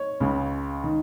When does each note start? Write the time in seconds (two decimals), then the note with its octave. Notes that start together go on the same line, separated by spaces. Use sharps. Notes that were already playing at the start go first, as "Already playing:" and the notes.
Already playing: C#5
0.20 C#2 C#3
0.83 D#3